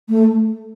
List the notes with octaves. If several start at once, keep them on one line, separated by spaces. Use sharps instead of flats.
A3